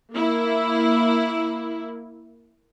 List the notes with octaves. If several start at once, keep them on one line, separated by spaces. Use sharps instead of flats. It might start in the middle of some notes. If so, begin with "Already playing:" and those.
A#3 E4